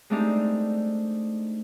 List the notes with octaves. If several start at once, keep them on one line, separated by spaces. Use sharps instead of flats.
G#3 A3 C4 D4 D#4 G4